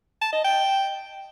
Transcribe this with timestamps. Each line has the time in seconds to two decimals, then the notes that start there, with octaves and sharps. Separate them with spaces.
0.22 A5
0.33 D#5
0.44 G5